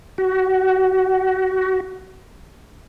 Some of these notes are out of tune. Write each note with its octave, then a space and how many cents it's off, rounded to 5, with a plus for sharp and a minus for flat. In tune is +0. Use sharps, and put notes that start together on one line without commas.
F#4 +25